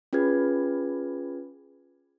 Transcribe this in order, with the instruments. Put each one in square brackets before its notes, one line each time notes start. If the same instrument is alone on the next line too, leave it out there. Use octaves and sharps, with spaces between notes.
[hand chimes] C#4 F4 G#4 B4 G#6